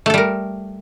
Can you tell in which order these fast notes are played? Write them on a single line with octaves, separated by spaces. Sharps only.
A3 A4 G3 A#4